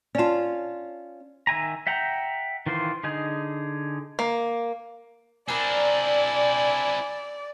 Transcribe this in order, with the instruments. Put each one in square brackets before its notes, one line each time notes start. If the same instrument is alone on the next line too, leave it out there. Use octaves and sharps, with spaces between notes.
[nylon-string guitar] C#4 F4 [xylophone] D5 A5
[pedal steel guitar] D#3 E5 G#5 A#5
E5 F#5 G5 A#5
D#3 E3 F4 C5
D3 D#4 G#4
[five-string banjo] A#3
[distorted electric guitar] C4 E4 [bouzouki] D4 A#4 [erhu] D5 [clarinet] G#5